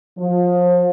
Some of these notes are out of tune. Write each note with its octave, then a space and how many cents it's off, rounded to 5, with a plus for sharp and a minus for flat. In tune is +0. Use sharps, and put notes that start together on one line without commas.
F3 +30